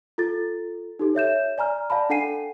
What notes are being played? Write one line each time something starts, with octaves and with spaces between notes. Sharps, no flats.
F4 A4 A6
D#4 G4 A4
C#5 E5 G6 E7
D5 G#5 A#5 F6
D5 F5 A5 B5
D4 A4 F#5 G#5 C7 D#7